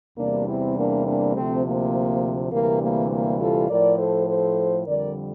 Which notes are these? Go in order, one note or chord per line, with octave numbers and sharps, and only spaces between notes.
E2 C3 G3 A#3 D4
C4 E4
A#3 D4
A#3 D4
D2 C3 F3 A3 C4
A#3
D2 C3 E3 G3 A#3
A#3
A#3
F4 A4
A2 F3 A#4 D5
A4 C5
A4 C5
F2 D3 G3 A#4 D5